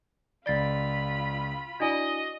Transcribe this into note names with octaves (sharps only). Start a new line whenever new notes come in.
C#2 F4 D5 B5 A6 C7 D7
D4 E4 F#4 D5 D#5 G#5